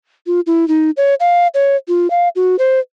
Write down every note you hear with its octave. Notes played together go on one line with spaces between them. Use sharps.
F4
E4
D#4
C#5
F5
C#5
F4
F5
F#4
C5